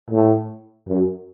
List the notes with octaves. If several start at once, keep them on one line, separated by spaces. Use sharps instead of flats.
A2
F#2